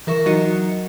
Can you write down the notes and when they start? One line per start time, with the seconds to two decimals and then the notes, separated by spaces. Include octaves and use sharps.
0.07 E3 A#4 E5 C#6
0.26 F#3 D#4 F#4 D#5 A#5 C#7